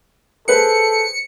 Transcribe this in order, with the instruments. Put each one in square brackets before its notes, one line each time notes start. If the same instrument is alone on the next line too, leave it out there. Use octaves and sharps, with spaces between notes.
[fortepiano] G#4 B4 C5 [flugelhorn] A4 [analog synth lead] C#7